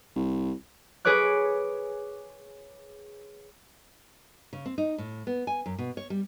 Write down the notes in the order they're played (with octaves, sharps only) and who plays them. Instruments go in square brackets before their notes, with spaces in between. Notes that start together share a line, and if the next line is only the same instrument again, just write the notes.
[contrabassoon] C2
[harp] G#4 B4 C#5 D6 F#6
[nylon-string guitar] C#3
C4
D#4
A2
B3
G#5
F#2
B2
C#5
G3